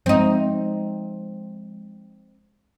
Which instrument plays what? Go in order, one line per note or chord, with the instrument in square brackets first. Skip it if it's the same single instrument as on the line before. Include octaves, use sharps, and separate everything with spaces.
[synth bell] F3 G#3 [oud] C4 D#4